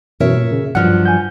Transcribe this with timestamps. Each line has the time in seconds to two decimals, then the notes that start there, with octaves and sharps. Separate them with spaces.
0.20 F#2 B2 E3 A#4 C#5 E5
0.37 A#2
0.52 C#3
0.75 G2 F3 F#3 F#5 F6
1.06 G#5 G6